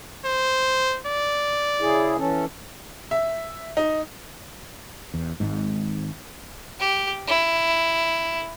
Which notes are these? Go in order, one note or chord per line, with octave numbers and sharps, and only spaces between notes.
C5
D5
C#3 E4 G#4
E3 C#4 A4
E5
D#4
E2
G#1 G#2
G4
E4